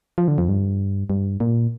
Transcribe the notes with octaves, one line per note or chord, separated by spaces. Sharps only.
F3
D3
F2
G2
G2
A#2